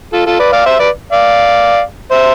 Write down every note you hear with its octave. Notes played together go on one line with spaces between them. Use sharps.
F4 A4
F4 A4
B4 D5
D5 F5
C5 E5
B4 D5
D5 F5
C5 E5